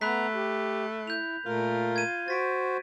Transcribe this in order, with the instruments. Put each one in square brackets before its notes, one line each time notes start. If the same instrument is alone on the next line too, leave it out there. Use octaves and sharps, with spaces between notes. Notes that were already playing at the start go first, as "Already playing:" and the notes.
[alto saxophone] A3 [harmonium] B3 A#5 [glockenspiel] B5 F#6 B6
[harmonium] G4
[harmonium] E4 [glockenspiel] G6 F7
[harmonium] A#2 A3 A#4 [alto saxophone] F4
[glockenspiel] G#6 D#7
[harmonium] F#4 C5 [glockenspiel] A6 B6 D7